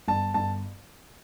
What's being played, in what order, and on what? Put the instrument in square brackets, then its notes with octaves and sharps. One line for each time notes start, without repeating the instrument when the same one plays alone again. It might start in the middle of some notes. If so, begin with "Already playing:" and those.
[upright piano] G1 [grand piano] A5
[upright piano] G1 [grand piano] A5